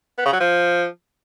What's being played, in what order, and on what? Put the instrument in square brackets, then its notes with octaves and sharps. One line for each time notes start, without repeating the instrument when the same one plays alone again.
[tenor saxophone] B3
C#3
F#3
F3